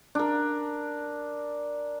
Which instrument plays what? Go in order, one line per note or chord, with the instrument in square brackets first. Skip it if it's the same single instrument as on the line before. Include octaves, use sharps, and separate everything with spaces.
[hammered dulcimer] D4 A#4